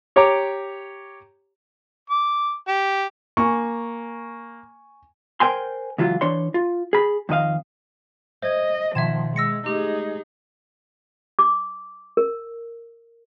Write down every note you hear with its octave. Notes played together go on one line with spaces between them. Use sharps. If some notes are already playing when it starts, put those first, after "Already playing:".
G4 C#5 A#5 D6
D6
G4
A#3 G#5 C#6
A#4 C5 G5 G#5 C6
C#2 E3 F#3 F4
E3 D4 C#5 C6
F4
G#4 B5
F2 D#3 D#5 F5
C5 D#5 E5 G#6
B2 D#3 F3 E5 C6 G#6 E7
G#3 E6 A#6 C#7
G#3 A3 D#4 G4 G#4
D6
A#4